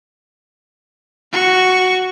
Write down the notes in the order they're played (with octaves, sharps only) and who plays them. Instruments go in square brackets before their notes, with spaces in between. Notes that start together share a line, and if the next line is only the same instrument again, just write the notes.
[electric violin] F#4 C#6